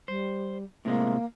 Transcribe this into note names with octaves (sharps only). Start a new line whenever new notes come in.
G3 C5
A2 C3 G#3 A#3